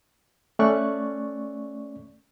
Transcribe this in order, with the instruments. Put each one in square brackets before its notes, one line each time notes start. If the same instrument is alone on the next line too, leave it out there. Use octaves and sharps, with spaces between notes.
[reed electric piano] A3 C#4 D5 C#6 F#6